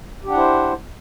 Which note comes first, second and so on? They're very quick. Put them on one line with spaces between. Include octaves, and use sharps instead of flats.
G4 D4 F#5 E4 C5